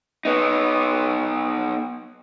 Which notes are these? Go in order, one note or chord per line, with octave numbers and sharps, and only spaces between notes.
B3 D#4